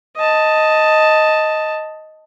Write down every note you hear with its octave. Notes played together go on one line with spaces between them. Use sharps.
D#5 A5